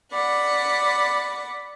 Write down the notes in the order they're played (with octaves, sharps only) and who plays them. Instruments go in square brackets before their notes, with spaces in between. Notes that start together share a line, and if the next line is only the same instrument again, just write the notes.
[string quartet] D5 F#5 B5